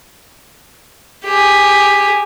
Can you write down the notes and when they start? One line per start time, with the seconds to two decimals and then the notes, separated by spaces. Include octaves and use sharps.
1.25 G4 G#4